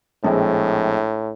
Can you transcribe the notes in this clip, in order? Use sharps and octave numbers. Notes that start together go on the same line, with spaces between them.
A#1 A2 G#3 C4